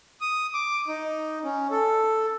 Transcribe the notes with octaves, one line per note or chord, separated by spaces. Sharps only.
D#6
D6
D#4
C#4
A4